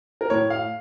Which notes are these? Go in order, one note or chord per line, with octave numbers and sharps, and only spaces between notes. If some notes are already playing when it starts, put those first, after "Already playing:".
A#4
A2 C#5
F5